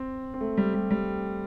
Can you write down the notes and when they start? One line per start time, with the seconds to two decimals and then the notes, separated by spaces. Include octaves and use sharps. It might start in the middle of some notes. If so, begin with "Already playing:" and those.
Already playing: C4
0.34 C4
0.41 A3
0.57 G3
0.74 G3
0.91 G3